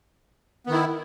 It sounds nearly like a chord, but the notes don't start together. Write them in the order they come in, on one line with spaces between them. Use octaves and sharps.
B3 D#3 E4